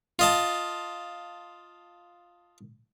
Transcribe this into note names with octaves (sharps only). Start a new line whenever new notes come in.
F4 D#5 A5